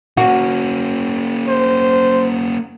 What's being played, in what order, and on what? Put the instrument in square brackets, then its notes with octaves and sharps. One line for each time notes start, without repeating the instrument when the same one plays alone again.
[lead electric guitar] A#3 C#4 [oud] F#4
[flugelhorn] C5